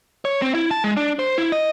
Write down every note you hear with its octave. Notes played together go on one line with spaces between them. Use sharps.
C#5
C4
E4
A5
G#3
D4
C5
E4
D#5